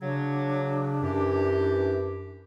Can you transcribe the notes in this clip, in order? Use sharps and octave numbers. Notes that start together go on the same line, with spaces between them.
C#3 F#3 D4
F#2 E3 G4